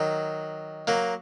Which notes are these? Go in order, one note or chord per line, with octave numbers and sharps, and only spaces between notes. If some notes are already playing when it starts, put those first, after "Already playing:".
Already playing: D#3 F#3
F#3 A#3